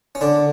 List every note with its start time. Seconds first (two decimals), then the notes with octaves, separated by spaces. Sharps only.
0.15 C#4
0.21 D3 D4